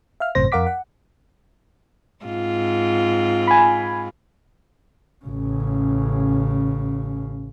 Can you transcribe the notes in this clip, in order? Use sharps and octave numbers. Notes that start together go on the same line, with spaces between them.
E5 F5 F6
G#1 F#2 A2 C3 C5 A#6
F2 A#4 F5 F#5 D6 B6
F#5
G#2 C4 F4
G#5 B5
A1 C#3